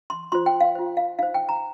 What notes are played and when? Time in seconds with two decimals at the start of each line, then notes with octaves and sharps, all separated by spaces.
0.10 C6
0.32 F4 C5 C6
0.46 G5
0.61 F5
0.75 F4 C5
0.97 F5
1.19 D#4 C5 F5
1.34 G5
1.49 A#5